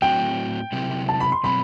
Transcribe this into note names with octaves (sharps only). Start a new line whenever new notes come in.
A2 F#3 C4 F#4 G5
C3 F#3 C4 E4 G4
A5
B5
C6
B2 F#3 C4 B5